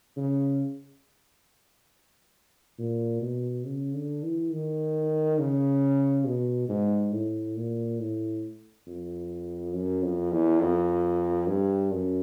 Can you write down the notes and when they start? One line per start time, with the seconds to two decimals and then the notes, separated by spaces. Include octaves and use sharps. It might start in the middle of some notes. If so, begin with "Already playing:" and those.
0.17 C#3
2.78 A#2
3.22 B2
3.65 C#3
3.94 D3
4.23 E3
4.52 D#3
5.39 C#3
6.26 B2
6.69 G#2
7.13 A2
7.56 A#2
8.00 A2
8.87 F2
9.74 F#2
10.03 F2
10.32 E2
10.61 F2
11.47 G2
11.92 F#2